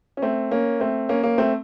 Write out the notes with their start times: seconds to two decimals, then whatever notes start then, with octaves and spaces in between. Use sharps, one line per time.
0.17 C#4
0.22 A3 C4
0.51 A#3 C#4
0.80 A3 C4
1.09 A#3 C#4
1.23 A#3 C#4
1.38 A3 C4